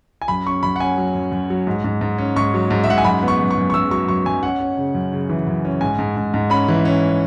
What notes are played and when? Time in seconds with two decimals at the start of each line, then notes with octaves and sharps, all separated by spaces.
0.22 G#5
0.28 F#2 B5
0.47 C#4 C#6
0.63 F#2 B5
0.76 F#5
0.80 C#4 G#5
0.98 F#3
1.15 F#2
1.32 F#2
1.50 F#3
1.67 G#2
1.84 G#2
2.01 G#2
2.18 C#4
2.36 G#2 C#6
2.54 F#3
2.71 G#2
2.84 E5
2.88 G#2 F#5
2.98 G#5
3.04 F#2 B5
3.23 B3
3.28 C#6
3.40 F#2
3.51 C#6
3.57 F#2
3.70 C#6
3.74 F#2 E6
3.91 F#3 C#6
4.08 F#2 C#6
4.26 F#2 G#5
4.43 C#4 F#5
4.60 C#4
4.77 C#3
4.95 F#2
5.13 C#3
5.29 E3
5.47 F#2
5.65 C#4
5.81 G#2 G#5
5.99 G#2
6.17 G#2
6.34 G#2
6.50 C#4 B5
6.68 E3
6.85 C#4